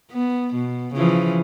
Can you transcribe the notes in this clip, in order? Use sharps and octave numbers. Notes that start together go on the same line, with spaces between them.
B3
B2
C#3 E3 F3